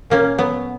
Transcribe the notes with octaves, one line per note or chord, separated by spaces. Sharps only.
A#2 A#3 C#4
F#3 B3